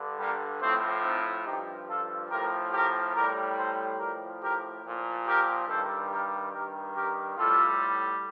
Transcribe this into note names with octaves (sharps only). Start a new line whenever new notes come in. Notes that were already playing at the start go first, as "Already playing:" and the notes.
Already playing: G2 D3
G3 A#3
A2 F3 A3 C4
C4 D#4
G2 F3 D#4 G4
F4 A4
A2 F3 G4 A#4
G4 A#4
A2 G3 G4 A#4
A4 C5
A2 F3 G4 A#4
G4 A#4
A#2 F3
G4 A#4
G2 D#3 G3 A4 C5
G4 A#4
G2 D#3 G3 G4 A#4
G4 A#4
A2 G3 F4 A4